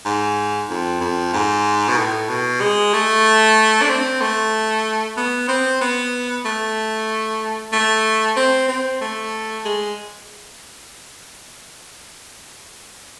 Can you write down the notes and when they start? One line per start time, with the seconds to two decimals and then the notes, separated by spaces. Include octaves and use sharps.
0.05 G#2
0.70 F2
1.01 F2
1.33 G#2
1.89 B2
1.98 A2
2.29 B2
2.61 G#3
2.93 A3
3.82 D4
3.89 C4
4.21 A3
5.17 B3
5.49 C4
5.81 B3
6.45 A3
7.72 A3
8.36 C4
8.68 C4
9.01 A3
9.65 G#3